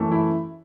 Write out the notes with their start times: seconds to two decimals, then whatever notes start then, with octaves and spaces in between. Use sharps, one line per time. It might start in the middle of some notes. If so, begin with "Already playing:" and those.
Already playing: F#2 E3 A3
0.12 E4